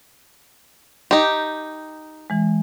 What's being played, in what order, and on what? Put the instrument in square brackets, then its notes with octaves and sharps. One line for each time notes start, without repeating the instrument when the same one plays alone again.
[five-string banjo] D#4 G4
[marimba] E3 G#3